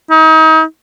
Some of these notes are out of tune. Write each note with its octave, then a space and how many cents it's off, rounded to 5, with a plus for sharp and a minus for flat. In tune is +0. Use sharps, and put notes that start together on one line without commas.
D#4 +35